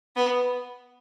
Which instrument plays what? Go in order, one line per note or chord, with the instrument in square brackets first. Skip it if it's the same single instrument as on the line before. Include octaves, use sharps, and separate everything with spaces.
[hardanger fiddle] B3